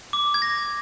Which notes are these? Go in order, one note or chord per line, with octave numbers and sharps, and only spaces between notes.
D6
G#6
A#6